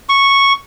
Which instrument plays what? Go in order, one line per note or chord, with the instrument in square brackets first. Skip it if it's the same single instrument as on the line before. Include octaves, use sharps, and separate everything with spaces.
[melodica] C#6